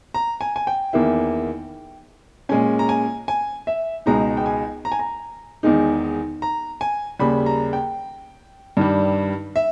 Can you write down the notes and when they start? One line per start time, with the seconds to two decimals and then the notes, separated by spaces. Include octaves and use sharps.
0.14 A#5
0.41 G#5
0.56 G#5
0.67 G5
0.93 E2 D#3 A#3 E4
2.49 A#2 G#3 C#4 G#5
2.79 A#5
2.89 G#5
3.28 G#5
3.67 E5
4.06 C#2 B2 G#3 D#4 A#5
4.37 G5
4.46 G#5
4.85 A#5
4.92 G#5
4.99 A#5
5.63 E2 D#3 G#3 D#4
6.42 A#5
6.81 G#5
7.19 D#2 C#3 G3 B5
7.46 A#5
7.73 G5
8.77 G2 D#3 G3
9.56 E5